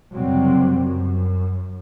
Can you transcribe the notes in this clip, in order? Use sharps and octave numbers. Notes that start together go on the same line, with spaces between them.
F#1 F#2 C3 F#3 G3 C4
F#2